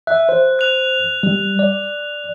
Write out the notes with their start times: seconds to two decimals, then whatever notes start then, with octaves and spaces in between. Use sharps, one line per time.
0.07 E5 F#6
0.29 C5
0.59 F#6 F7
1.23 G3
1.59 D5